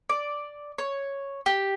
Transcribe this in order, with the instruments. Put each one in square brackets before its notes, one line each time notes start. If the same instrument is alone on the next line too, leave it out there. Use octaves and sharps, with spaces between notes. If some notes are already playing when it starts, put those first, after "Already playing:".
[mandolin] D5
C#5
G4